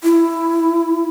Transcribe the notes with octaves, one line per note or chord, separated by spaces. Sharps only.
E4